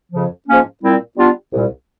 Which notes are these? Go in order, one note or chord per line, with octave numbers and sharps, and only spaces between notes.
F2 C#3 F3
G#2 F3 A#3 C#4
A#2 G3 C4 E4
G3 B3 D4 F4
C2 A#2 G3